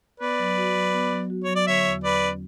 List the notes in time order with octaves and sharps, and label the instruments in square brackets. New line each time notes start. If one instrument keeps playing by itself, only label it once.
[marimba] B3 [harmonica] B4 D5
[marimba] F#3
F#4
F#3
B3
F#3
F#4
[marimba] F#3 [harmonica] C#5
[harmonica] D5
[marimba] D3 [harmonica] C#5 E5
[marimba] E2
[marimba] F#3 [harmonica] B4 D5
[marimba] C#4